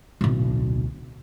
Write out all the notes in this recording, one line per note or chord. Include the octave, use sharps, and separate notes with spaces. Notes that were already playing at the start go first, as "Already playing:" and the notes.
D1 B1